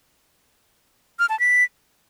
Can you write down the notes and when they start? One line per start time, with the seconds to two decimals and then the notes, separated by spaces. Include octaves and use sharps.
1.19 F6
1.29 A5
1.40 B6